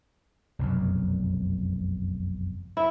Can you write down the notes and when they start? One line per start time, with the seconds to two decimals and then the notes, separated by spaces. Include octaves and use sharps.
0.59 F1 B1 F#2
2.77 E4